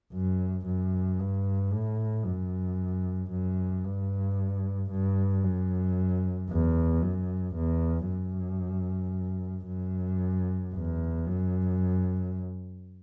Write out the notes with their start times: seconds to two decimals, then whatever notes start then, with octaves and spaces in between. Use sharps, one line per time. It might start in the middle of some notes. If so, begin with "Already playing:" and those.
0.13 F#2
0.66 F#2
1.19 G2
1.73 A2
2.25 F#2
3.31 F#2
3.84 G2
4.90 G2
5.43 F#2
6.50 E2
7.02 F#2
7.55 E2
8.09 F#2
9.67 F#2
10.74 E2
11.26 F#2